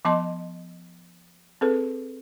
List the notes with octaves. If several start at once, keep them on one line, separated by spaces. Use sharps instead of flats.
F3 B3 D#5 A5 C6 D6
C4 G#4 A4 B4